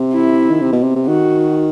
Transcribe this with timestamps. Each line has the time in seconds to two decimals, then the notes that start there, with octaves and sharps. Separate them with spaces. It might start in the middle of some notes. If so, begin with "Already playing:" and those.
Already playing: C3
0.14 E4
0.50 D#3
0.61 C3
0.72 B2
0.83 C3
0.96 C3
1.07 D#3 F#4